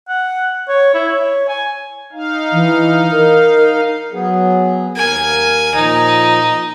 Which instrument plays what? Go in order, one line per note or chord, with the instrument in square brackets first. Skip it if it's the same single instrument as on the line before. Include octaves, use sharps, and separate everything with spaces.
[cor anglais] F#5
C#5
E4
C#5
G#5
[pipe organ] D#4 F5
[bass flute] E3
A#4
[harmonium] F#3 B3 G#4
[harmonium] D#2 A#4 [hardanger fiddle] G#5
[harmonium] A#2 F3 [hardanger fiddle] D#4